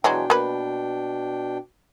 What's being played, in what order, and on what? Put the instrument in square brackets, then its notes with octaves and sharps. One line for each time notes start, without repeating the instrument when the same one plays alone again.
[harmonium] B2 D4 G5 [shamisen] E3 F#3 G#3
[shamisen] A#3 B4